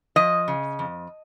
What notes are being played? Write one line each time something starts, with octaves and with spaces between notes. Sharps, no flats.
F3 D#5
C#3
F2